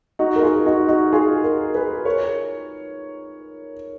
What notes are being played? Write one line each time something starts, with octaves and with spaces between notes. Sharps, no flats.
D#4 F#4
A#4
F4 G#4
D#4 F#4
D#4 F#4
F4 G#4
F#4 A#4
G#4 B4
A#4 C#5